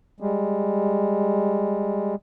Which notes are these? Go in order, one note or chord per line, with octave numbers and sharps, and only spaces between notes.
G3 G#3